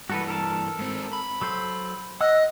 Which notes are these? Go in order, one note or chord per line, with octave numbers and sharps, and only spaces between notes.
G2 E3 F#4 A4 B4
A4 A#4 A5
G#2 C4
B5
F#3 A4 C5
D#5 F#5 E6 F#6